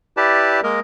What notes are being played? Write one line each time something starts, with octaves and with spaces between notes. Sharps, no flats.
E4 G4 B4 D5 A5
G#3 A#3 A#4 D#5